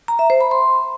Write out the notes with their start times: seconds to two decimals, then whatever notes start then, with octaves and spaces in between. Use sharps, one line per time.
0.08 A#5
0.19 E5
0.30 C5
0.41 B5
0.51 C6